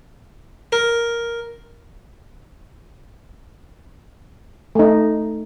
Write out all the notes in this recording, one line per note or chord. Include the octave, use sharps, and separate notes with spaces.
A#4
A3 D#4